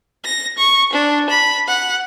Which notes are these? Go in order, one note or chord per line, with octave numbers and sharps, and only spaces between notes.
A#6
C#6
D4
B5
F#5